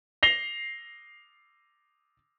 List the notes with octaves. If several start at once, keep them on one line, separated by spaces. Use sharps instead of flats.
A#6 C7 F7 G7